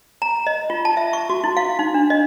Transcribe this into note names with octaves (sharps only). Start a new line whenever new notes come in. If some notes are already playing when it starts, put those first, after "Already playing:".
A#5
D#5
F4
A5
E5
C#6
F#4
E4
F5
D#4
D4
D#5